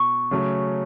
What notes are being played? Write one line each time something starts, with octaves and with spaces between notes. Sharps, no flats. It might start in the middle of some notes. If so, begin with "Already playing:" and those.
Already playing: B2 C#6
C#3 F#3 A3 C#4